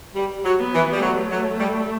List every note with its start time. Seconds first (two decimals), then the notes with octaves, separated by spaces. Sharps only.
0.15 G3
0.44 F#3
0.59 B3
0.73 E3
0.93 G3
1.01 F#3 A3
1.30 F#3
1.59 G3